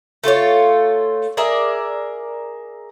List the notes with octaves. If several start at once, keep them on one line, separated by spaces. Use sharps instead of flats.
A3 F4 F#4 C#5
G#4 A#4 D5 E5